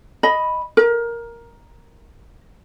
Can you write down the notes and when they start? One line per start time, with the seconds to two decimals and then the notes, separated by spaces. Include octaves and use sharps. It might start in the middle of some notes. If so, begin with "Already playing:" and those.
0.23 D#5 B5
0.77 A#4